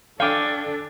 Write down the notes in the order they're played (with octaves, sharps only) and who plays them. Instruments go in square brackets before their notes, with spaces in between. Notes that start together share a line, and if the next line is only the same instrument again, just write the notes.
[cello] D4 [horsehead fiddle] A4 [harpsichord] C#5 G5 G#5 [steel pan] F5 D6